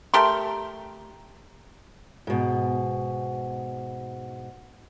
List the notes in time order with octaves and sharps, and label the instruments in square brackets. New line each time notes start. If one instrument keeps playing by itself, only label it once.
[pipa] A3 G4 A#4 C6
[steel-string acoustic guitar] G#2 B2